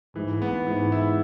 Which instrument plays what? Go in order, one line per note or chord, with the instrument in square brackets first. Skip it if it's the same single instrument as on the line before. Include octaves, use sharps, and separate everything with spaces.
[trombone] G#2 [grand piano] E3
[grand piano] B3
[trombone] G#2 [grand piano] E3
[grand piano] E4